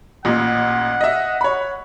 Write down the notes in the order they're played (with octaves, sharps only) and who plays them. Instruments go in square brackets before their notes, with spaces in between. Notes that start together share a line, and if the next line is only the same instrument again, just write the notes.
[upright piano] A1 A#2 [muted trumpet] F#5
[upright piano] D#5 E5
C#5 B5